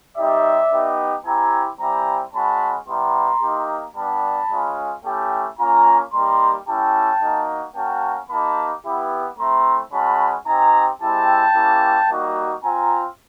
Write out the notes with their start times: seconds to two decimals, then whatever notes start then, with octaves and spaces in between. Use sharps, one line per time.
0.17 G3 C4 D#4 G4 D5 E5
0.72 B3 D#4 G4
1.25 C4 E4 G4 G#5 A#5
1.80 G3 C4 E4 G4 G#5 A#5
2.34 G#3 C#4 F#4 A5 B5
2.88 G3 B3 E4 G4 A#5 C6
3.42 A#3 D#4 G4
3.96 G3 B3 D4 A5 B5
4.51 G#3 C#4 F4
5.05 A3 C#4 E4 G4 G5 A5
5.59 A#3 C#4 F4 G#5 A#5
6.13 G3 A#3 D#4 G4 A#5 C6
6.67 A3 C#4 E4 G4 G5 A5
7.21 A#3 D#4 F#4
7.76 A#3 C#4 F#4 G5 A5
8.30 A#3 D#4 G4 A5 B5
8.84 B3 E4 G4
9.38 A3 C4 E4 A#5 C6
9.92 G#3 C#4 F#4 A5 B5
10.47 C4 D#4 G4 G#5 A#5
11.01 G#3 C4 E4 G4 G5 A5
11.55 A#3 C#4 E4 G4
12.10 G3 A#3 D#4 F#4
12.63 C4 F4 G#5 A#5